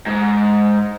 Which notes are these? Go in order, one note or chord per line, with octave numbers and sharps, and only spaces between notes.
G#2